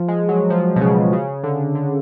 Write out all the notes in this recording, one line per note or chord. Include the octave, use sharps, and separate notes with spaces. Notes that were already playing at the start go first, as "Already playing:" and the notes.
Already playing: F3
G#3
F#3
F3
B2
C#3
C#3
D3
D3